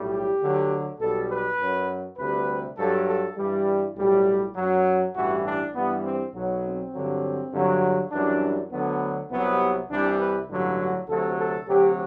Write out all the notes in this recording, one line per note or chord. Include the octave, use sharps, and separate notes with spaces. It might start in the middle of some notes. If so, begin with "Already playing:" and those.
Already playing: B1 A2 G3
G4
D2 D3 F#3
B1 B2 G3 A4
B4
F#2 F#3
D2 C3 G3 B4
G2 F#3 A4
A4
G2 E3 G3
B1 A2 G3
F#2 F#3
A1 G2 E3 G3 F#4
D4
G2 E3 G3 B3
C4
B1 B2 F#3
C4
G2 D3 F#3
G2 D3 F#3
F#2 E3 G3 D4
D2 D3 F#3 B3
C2 C3 F#3 B3
C2 C3 E3 G3 D4
B4
A1 G2 D3 F#3
F#4
D2 C3 F#3 A4
A4
D2 C3 F#3 G4